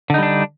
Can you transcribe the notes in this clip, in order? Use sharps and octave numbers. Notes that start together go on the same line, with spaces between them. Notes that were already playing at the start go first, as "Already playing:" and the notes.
D3 G3 D4 D#4